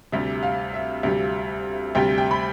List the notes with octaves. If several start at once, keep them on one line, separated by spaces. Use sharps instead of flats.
D2 C3 G3
F5
E5
D2 C3 G3
D2 C3 G3 G5
G5
B5